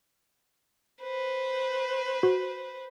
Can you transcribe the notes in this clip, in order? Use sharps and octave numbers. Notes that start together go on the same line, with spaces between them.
B4 C5
F#4